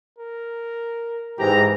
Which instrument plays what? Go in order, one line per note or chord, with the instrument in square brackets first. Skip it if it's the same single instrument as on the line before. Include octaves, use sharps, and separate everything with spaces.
[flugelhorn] A#4
[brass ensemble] G#2 E3 A#5 [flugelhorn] G4